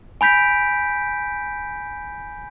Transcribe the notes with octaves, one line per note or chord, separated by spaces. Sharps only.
G#5 B5 G6 B6 D7